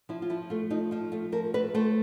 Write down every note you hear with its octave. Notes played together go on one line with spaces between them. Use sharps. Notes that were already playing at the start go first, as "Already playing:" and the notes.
F3 E4
F4
F3 E4
A3 F4
F3 D#4
F3 F4
A3 F4
F3 A#4
A3 B4
A3 C5